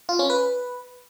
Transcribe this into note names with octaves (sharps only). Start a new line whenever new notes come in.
F4
C#4
B4